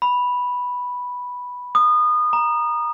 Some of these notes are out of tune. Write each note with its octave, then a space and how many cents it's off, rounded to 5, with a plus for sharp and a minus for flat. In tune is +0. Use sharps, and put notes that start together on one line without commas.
B5 -5
D#6 -25
A#5 +20